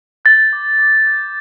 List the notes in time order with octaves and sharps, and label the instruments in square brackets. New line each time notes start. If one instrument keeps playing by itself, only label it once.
[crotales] G6 A6
D6
D6
G6